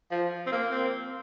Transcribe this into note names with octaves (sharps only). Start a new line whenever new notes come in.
F3
C4
A#3
C4